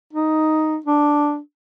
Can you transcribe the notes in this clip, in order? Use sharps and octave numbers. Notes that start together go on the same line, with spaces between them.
D#4
D4